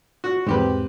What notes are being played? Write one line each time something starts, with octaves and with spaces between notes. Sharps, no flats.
F#4
E2 G#2 C4 G4 B4